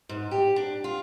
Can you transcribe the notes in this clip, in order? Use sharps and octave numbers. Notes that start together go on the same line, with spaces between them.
G#2
G4
D4
F4